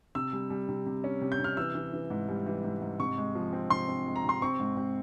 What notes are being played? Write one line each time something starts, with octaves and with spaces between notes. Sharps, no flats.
C3 E6
G3
G3
C3
C3
C#4
C3
G6
C3 F6
E3 E6
E3
E3
G#2
G3
E3
G#2
G#2
C3 C#6
G#3
F3
C4
C3 C6
C4
G#3
A#5
C3 C6
C4 C#6
G#2
C4